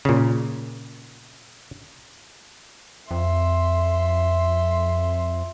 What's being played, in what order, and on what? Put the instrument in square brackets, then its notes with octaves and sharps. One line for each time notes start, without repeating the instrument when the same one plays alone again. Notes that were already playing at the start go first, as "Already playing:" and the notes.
[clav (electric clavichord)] A#2 C#3
[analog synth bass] F2 [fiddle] E5 C6